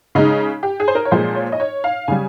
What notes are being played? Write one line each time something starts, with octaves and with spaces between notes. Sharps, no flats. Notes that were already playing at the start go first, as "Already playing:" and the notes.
C#3 G#3 D#4
G4
G#4
C5
A#4
C#5
A#2 F3 G#3 C5
C#5
D#5
C#5
F5
C#3 G3 G#5